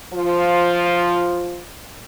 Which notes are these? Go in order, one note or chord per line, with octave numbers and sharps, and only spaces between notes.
F3 F4